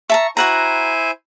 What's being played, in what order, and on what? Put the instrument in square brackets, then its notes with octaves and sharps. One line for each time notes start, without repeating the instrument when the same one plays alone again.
[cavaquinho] E5 A5 A#5 [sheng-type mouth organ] C#6
[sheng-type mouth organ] E4 C5 G#5 [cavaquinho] F#4 F#5 A#5